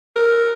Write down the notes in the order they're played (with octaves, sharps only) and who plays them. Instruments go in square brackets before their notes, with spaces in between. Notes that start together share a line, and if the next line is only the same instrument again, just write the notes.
[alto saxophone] A#4